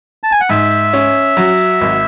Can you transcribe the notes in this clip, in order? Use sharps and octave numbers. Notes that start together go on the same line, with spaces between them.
A5
G#5
F#5
G#2 E5
C#4
F#3
G#1